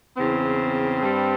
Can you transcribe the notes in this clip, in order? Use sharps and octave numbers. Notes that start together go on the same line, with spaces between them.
E2 C#3 E3 C4
G2 G3